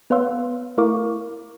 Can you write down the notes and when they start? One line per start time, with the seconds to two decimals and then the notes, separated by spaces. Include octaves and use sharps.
0.10 B3 B4 C#5 F5 C6 E6
0.77 A3 E4 A#4 F5 C#6 D6